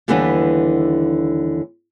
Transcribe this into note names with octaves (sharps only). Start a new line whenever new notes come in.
D#2 D3 E3 G3 B3 D4